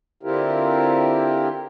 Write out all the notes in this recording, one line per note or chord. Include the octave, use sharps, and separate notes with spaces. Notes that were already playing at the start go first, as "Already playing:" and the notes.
D3 C4 E4 F4 G4 A#4